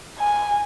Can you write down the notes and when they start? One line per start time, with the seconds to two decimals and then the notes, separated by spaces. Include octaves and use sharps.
0.19 G#5